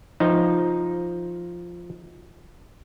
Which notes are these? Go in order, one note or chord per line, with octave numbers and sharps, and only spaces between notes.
F3 D#4